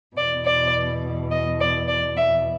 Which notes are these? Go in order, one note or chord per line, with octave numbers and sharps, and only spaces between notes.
E2 B2 D5
D5
D#5
D5
D5
E5